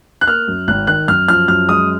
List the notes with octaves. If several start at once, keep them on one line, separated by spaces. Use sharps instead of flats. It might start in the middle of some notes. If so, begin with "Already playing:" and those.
F#6
A#3 F6
F#2
G#1 F#6
D#3 F#6
F#2 F6
F3 F6
F#2 F6
G#3 D#6